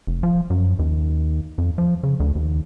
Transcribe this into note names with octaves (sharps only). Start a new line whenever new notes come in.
F1
F3
F#2
D#2
F2
F3
C#3
D2
D#2